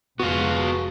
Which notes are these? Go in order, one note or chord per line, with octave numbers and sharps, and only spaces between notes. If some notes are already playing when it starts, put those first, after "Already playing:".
F1 G#3 B3 F4 F#4